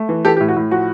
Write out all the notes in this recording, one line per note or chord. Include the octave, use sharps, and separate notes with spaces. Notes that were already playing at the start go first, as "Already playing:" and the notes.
Already playing: A3
E3
E3 G4 A4
G4
A2
F#4
A2
F3 F#4